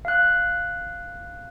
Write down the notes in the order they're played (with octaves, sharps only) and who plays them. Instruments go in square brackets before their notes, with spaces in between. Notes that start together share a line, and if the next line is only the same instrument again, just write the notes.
[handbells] F5 F#6